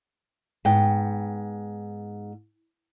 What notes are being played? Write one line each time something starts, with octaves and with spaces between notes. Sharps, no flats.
G#2 B3 F#5 G5